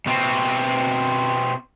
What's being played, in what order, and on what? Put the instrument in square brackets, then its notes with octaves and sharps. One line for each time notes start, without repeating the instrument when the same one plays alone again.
[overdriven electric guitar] B2 C4